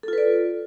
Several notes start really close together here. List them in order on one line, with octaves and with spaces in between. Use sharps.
A4 F4 B4 D5